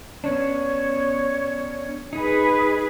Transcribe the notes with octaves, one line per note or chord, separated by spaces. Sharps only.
B3 C#4 D4 C#5
D#4 G#4 B4